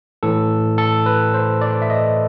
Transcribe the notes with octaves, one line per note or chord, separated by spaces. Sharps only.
A2 E3 A4
A4
B4
C5
D5
E5
D#5